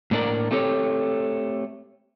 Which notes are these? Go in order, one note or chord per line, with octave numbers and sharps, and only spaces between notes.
A2 A#3 D4 A#4 D5
A3 C4 G4 A4 C#5